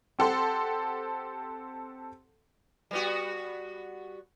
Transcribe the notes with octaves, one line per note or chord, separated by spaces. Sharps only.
C4 G4 A4 F#5 C6
G3 B3 F#4